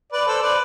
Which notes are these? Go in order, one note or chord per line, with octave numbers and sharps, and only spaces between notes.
B4 D5
A4 C5
B4 D5